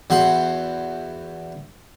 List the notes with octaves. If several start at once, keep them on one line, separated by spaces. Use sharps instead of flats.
E2 F#4 F#5 C6